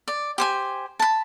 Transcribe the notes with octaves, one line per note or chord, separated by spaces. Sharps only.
D5
G4 C5 G#5
A5 B5